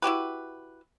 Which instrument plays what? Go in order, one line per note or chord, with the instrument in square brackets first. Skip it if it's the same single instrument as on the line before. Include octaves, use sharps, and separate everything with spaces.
[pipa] E4 F#4 G4 B4